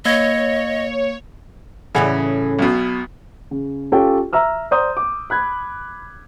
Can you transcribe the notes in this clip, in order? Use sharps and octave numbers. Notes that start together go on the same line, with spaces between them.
A#3 C#5 D#5 G#6
A2 C#3 E3 C#4 G#4 F#5
B1 B2
C#3
C#4 F4 G4 A4 C#5 G5
E5 A#5 E6 F6
C5 D5 A#5 C6 D#6 G6
D6
B5 F#6 G#6